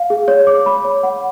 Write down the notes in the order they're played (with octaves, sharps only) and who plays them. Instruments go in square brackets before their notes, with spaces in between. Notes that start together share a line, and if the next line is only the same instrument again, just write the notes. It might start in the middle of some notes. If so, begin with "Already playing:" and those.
Already playing: [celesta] F5
G#4
C#5
D6
B5
C#5
F#5